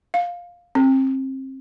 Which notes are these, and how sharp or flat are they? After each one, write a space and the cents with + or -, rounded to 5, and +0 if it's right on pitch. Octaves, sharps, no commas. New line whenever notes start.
F5 +10
C4 +30